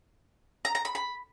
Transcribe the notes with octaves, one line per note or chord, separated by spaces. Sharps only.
A#5
A#5
B5
B5